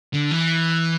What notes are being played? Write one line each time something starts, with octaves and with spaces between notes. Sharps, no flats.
D3
E3